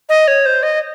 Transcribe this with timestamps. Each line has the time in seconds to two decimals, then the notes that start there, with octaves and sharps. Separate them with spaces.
0.09 D#5
0.28 C#5
0.46 C5
0.63 D#5